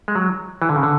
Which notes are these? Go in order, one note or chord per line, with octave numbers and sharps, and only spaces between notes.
G#3
F#3
E3
D3
C#3
D3